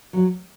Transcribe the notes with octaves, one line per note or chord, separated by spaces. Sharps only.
F#3